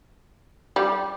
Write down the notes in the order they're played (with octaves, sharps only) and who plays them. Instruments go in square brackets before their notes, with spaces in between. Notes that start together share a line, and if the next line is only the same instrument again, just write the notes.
[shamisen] G3